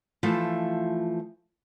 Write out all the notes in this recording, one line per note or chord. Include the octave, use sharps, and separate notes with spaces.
E3 F3 A3 F4